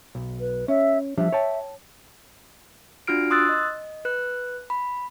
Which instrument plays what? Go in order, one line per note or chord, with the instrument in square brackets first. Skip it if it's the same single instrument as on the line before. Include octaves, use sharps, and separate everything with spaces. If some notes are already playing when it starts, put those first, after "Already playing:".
[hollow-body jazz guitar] B1
[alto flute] B4
[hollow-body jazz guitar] C#4 [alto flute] E5
[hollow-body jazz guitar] F3 G3 D4 [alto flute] E5
[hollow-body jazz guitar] C#5 G5 A5
[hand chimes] D4 F4 F#4 F6 D7
C6 D#6 E6 F#6 A6
D#5
B4 F#6
B5